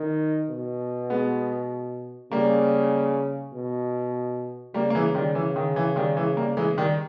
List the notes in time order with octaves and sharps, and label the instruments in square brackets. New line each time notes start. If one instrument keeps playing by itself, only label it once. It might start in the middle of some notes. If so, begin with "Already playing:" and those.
Already playing: [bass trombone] D#3
B2
[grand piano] G#3 B3
[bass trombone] C#3 [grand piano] G3 A#3
[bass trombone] B2
[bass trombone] C#3 [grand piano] G3 A#3
[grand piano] A#3
E3 G#3
D#3 G3
E3
D#3
E3
D#3 G3
E3 G#3
G3 A#3
E3 G#3
D#3 G3